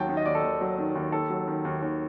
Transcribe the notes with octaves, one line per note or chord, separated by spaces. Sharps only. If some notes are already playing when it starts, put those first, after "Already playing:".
Already playing: D#2 F#3 G5 A5
D#3
D#5
D#2 D5
A4
D#2
F#3
D#3
D#2
D#2 A4
F#3
D#3
D#2
D#2